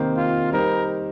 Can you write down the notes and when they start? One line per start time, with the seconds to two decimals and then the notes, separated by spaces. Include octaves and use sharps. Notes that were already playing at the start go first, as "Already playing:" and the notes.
Already playing: C3 D#3 A#3 D#4 C5
0.17 F4
0.53 G3 D#4 A#4 C5